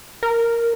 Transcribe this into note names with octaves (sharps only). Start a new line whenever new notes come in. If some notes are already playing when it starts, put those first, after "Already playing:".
A#4